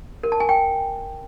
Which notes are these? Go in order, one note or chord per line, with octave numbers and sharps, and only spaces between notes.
A#4
A5
G#5
G5